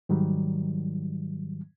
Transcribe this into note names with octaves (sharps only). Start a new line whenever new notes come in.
G#2 D#3 F#3 G3